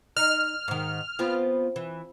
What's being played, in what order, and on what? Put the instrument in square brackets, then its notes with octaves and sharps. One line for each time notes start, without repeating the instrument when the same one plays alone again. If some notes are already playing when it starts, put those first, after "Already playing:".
[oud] D#4 [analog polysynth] F6
[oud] G#2 D#3
B3 C4 F4
E3